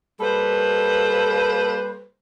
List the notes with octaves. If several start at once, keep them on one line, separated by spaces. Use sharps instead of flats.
G3 A#3 A4 B4 C5